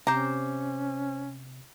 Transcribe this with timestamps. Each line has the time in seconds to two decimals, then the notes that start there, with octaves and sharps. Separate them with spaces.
0.07 C3 C#4 C5 A#5 D6